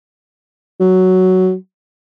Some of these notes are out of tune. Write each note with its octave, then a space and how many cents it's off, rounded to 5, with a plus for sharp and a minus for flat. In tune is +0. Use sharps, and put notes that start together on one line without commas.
F#3 +5